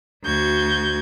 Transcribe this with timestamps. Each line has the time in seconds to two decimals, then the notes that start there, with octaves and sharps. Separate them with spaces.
0.24 D2 F#4 G6 G#6